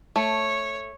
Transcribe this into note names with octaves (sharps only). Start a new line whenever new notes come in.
A3 C#5